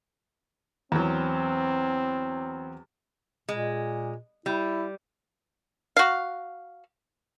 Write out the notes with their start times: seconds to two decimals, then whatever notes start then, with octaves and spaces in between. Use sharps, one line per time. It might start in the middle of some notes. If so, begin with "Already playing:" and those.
0.92 E2 F#3 C4
3.49 A#2 G#3
4.46 G3 E4
5.96 F#4 F5